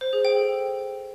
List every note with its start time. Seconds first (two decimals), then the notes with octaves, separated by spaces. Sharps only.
0.01 C5
0.13 G#4
0.25 G5
0.36 A4